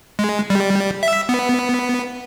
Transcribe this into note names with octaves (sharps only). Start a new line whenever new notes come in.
G#3
G3
E5
B3